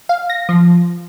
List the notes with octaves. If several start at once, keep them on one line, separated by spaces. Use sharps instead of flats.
F5
A#6
F3